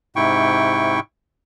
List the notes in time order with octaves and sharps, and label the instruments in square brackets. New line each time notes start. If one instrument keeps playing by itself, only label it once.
[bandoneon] G#2 C3 E4 G5 C#6